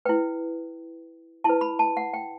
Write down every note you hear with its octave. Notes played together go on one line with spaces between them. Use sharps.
E4 B4 G5
E4 B4 A5
B5
A5
F#5
G5